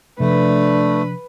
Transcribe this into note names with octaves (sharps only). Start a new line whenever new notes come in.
C3 F3 A3 D4 B4